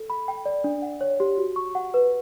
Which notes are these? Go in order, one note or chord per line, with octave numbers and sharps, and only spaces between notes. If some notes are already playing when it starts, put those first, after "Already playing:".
Already playing: A4
B5
G5
D5
D4
F#5
C#5
G4
F#4
C#6
F#5
B4